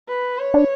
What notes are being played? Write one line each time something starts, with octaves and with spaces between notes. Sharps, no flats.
B4
C#5
D4